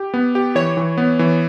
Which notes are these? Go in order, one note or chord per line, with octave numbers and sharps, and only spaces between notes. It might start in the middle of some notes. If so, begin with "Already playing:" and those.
Already playing: G4
B3
G4
E3 C#5
E3
B3
E3